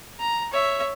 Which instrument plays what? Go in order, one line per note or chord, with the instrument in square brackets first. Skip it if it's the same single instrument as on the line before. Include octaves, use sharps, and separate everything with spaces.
[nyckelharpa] A#5
C#5 E5